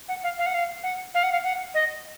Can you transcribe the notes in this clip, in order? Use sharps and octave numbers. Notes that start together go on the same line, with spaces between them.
F#5
F5
F5
F#5
F5
F#5
F5
F#5
F5
F#5
D#5